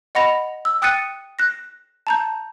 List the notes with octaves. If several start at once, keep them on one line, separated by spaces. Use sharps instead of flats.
D#5 F#5 B5 A#6 F7
E6
G5 D#6 F#6 A6 C#7 D#7
F#6 A#6
A5 A#5 G6